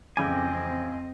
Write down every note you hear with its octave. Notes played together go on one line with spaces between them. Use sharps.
A1 F2 C#3 C4 D#5 G5 G#5 D6